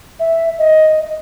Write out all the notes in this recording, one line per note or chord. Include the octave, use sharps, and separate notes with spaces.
E5
D#5